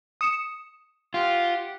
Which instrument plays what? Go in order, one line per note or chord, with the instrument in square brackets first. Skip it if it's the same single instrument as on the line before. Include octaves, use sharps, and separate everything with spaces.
[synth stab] D#6 C#7 E7
[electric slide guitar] F4 [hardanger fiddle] G4 F#5